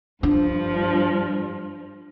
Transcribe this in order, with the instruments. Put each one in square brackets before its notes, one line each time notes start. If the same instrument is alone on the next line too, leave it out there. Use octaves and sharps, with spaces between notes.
[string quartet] G2 F3 [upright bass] D4